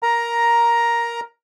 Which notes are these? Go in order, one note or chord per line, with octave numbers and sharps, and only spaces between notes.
A#4 A#5